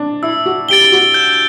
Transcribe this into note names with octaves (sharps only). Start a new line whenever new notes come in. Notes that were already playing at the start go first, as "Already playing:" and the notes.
Already playing: D4
E4 E6
F#4
G4 A6 D7 G7
F#4
G6